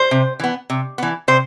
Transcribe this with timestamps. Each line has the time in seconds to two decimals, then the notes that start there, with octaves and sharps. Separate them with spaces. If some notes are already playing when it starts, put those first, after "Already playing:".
Already playing: C5
0.11 C3
0.40 E3 B3
0.70 C3
0.98 E3 B3
1.28 C3 C5